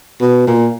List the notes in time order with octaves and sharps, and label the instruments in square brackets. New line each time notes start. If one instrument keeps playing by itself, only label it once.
[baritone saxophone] B2
A#2